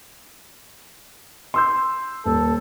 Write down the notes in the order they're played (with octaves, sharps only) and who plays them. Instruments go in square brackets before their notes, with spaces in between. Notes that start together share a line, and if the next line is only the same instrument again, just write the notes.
[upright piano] C6 E6 G6
[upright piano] D#1 [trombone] A4